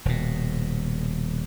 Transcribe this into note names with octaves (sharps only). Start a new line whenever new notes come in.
D#1 B2